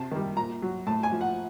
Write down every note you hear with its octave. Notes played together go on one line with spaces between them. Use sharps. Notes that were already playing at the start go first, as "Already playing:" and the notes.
Already playing: C3 A5
D#3 G3
A#2 A#5
F#3
A2 A5
G#5
F3
F#5